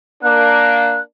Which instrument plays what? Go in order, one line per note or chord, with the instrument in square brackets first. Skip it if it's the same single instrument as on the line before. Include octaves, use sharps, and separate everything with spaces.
[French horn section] A#3 D4 [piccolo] F#6